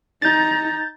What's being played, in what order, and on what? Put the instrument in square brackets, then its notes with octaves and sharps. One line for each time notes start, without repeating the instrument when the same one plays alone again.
[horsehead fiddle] D#4 A#5 [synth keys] G6 A6